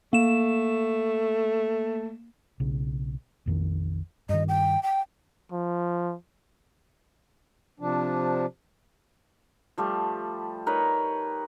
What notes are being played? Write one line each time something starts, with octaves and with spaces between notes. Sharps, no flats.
A3 A#3 E7
B1 C#3
A#1 F2 D#3
G2 D#3 D#5
G5
G5
F3
C3 F3 D4
F3 G3 A3
D#4 A#4 B4 C#5